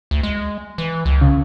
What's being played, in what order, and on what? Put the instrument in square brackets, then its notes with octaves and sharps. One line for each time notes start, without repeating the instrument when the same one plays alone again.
[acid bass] D2
G#3
E3
C#2
[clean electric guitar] C#3